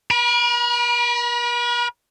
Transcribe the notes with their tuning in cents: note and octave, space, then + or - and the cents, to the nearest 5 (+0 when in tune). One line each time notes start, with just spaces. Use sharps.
A#4 +45 B5 -35